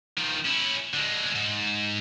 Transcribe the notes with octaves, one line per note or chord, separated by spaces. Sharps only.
D#3 F3
C#4 E4
D3 G#3
G#2